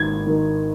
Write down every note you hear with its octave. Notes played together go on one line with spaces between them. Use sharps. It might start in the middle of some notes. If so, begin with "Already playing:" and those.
Already playing: G#1 G#2 D#3 G#6
D#3